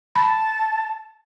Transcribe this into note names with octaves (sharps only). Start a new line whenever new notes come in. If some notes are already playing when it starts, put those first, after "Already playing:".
A5 B5